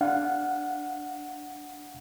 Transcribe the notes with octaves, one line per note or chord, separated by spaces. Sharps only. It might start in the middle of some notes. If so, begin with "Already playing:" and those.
D4 F5 F#5